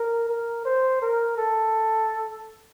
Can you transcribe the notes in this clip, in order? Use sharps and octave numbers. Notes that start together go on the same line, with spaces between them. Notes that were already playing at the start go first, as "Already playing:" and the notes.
Already playing: A#4
A#4
C5
A#4
A4